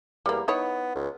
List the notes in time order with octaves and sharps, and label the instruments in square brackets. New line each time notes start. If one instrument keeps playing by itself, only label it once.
[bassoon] E2 [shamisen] G3 A#3
[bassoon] B3 [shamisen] D#4 E4 C#5
[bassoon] C#2